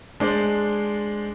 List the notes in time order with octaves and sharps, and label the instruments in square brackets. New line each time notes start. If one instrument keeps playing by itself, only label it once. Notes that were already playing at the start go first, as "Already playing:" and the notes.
[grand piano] G#3 D4 C5 D5